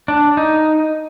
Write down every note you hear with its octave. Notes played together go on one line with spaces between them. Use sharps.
D4
D#4